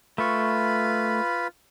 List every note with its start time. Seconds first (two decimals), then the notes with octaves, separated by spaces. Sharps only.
0.18 A3 F4 B4 B5 C#6